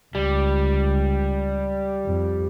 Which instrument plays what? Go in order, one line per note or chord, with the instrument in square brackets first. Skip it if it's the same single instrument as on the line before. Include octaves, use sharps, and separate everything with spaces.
[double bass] C#2 [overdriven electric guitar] G3
[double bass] F2